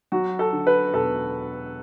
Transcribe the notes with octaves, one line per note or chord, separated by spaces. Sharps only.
F#3 F#4
A4
D3
B4
E1 A4